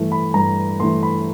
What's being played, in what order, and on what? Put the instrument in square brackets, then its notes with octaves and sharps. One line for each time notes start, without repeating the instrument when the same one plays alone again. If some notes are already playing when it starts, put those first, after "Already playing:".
Already playing: [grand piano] G2 E3 A3
B5
G2 A#5
E3 A3 C6
B5